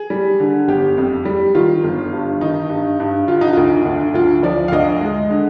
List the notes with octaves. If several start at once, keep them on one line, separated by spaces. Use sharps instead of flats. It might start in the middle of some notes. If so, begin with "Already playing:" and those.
Already playing: G#4
G3
D3
G1 G4
F2
G3
D#3 F4
G1
G2
D#3 D#4
G2
G2
D3 F4
D#4
D2 F4
D2
D2 F4
F3 D5
F5
D2 D#5
G#3
D3